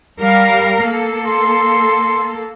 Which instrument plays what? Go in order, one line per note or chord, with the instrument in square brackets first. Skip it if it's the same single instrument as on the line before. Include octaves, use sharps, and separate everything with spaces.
[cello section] G3 A#4 F5
A#3 A4
[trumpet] C6